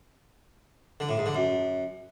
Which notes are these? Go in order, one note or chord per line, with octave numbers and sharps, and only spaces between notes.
D3
A2
G#2
D3
F#2